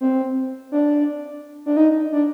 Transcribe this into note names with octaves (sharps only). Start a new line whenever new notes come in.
C4
D4
D4
D#4
D4